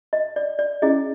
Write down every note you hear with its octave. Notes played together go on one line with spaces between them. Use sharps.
D#5
D5
D5
C#4 E4 G#4 D#5